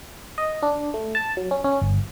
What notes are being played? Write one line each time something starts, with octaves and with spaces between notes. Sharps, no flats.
D#5
D4
A3
A5
F#3
C#4
C#4
G1